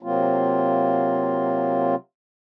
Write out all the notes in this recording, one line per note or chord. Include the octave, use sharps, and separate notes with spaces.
C3 F#3 A#3 C4 F4